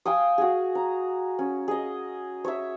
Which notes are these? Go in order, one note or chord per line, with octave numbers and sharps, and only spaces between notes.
F5 G5 G#5 D#6
F#4 G#4
A#5
C#4
G#4 D#5
C#5 E5